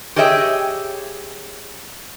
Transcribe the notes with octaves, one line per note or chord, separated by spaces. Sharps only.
G4 G#4 C#5 D#5 E5 G5